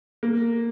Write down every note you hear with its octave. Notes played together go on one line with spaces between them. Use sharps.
A#3